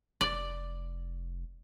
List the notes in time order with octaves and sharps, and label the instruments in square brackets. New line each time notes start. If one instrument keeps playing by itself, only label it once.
[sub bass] F1 [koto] D5